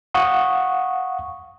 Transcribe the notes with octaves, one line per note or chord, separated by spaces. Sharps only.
F5 F#5 C#6 D#6